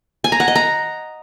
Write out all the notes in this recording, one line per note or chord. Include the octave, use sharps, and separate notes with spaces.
G#5
A#5
F#5
D#5
A#5